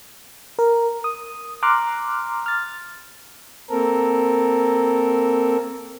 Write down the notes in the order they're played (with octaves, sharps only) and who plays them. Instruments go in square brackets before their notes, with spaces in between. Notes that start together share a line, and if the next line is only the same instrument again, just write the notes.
[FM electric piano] A#4
D#6
A#5 C6 D6 F6 F#6
F6 A6
[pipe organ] A#3 C4 A4 A#4